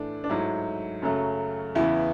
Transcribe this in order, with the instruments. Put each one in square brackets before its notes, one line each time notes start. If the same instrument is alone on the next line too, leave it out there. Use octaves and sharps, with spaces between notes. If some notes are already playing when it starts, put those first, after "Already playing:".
Already playing: [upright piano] A2 E3 A3 D4
D4
G#2 F#3 A3 E4
F#2 C#3 F#3 A3
E2 C#3 E3 B3 E4